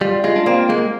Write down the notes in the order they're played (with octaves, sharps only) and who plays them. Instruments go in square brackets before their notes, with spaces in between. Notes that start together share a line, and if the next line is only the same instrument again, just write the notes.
[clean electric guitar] G3 [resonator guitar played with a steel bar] F4
[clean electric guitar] G#3 [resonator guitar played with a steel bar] F4
[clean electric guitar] D4
[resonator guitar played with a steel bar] A#3 [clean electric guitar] C4
[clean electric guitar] G#3 [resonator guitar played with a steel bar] A#3